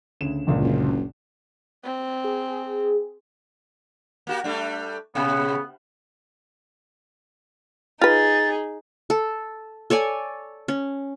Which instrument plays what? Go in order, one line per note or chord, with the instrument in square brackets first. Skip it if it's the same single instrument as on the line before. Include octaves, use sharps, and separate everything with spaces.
[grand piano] D2 C#3 E7
G1 C#2 A#2
[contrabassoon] F#1
[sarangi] C4
[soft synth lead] G#4
[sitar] A#3 F#4 G4
G3 A3 D4
[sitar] A#2 [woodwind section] C#3 B3
[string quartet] D#4 G#4 [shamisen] F4 B4 [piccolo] A6
[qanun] A4
A4 C#5 D5 G#5
C#4